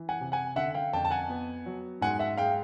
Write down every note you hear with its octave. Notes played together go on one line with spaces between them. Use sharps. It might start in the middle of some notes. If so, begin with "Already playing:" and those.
Already playing: E3
F#5 G#5
C3
F#5 G#5
D3 E5 F#5
F5 G5
F2 G5 A5
A5
F#5 G#5
B3
F#3
G#2 F#5 G#5
E5 F#5
G#3 F5 G5